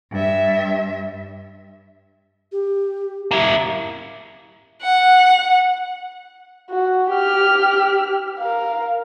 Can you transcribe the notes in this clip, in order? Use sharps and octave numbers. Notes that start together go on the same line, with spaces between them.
G2 E5
G4
A#3 E4
F#5
F#4
G4 F6
A#4 F5